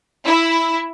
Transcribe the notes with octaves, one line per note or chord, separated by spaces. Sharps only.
E4